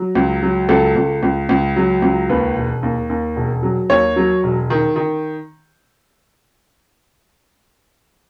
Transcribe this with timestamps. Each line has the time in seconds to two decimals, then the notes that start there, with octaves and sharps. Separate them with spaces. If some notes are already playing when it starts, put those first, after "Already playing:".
Already playing: F#3
0.15 C#2
0.43 F#3
0.68 C#2 A4
0.96 C#2
1.23 C#2
1.49 C#2
1.76 F#3
2.02 C#2
2.29 D#2 B4
2.56 E1
2.83 D#2
3.10 D#2
3.36 E1
3.63 F#3
3.90 D#2 C#5
4.16 F#3
4.43 E1
4.70 D#3
4.96 D#3